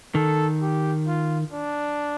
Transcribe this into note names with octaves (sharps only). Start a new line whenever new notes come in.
D#3 A4
G4
F4
D4